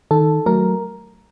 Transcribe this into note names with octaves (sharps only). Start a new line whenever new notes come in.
D#3 A4
F#3 A3 A#4